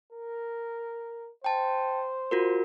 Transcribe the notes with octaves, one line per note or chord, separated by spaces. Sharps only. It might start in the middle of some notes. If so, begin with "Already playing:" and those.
A#4
C5 G5 A5
F4 F#4 A#4